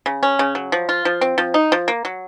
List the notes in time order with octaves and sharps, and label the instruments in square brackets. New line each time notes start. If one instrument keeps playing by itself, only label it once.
[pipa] C#3
C#4
C#3
F#3
F3
F4
F3
C4
F3
D#4
F3
A#3
F#3